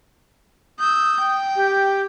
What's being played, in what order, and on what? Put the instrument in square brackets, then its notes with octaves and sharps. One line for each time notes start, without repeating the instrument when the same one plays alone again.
[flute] D#6 [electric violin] E6 G6
[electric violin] G5
[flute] G4